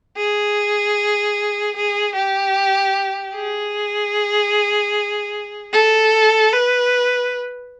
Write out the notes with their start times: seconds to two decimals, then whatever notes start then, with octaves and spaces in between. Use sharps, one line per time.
0.17 G#4
1.76 G#4
2.15 G4
3.34 G#4
5.73 A4
6.52 B4